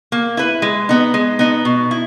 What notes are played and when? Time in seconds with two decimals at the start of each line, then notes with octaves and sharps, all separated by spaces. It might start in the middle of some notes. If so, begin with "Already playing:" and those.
0.12 A#3
0.37 E4 B4
0.62 G#3
0.89 B3 D#4
1.14 G#3
1.39 B3 D#4
1.65 B2
1.91 E4